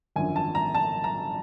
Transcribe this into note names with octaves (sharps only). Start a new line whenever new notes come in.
G#1 F#2 D3 F3 G#5
A5
A#5
A5
A#5